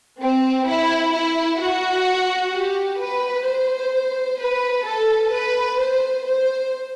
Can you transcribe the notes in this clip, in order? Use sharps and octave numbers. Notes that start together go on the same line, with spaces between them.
C4
E4
E4
F#4
G4
B4
C5
B4
A4
B4
C5
C5